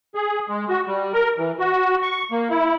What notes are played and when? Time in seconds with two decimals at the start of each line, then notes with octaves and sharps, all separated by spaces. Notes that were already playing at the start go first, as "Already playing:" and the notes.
0.15 G#4
0.49 G#3
0.69 F#4
0.87 G3
1.13 A#4
1.38 E3
1.59 F#4
2.03 C#6
2.32 A#3
2.50 E4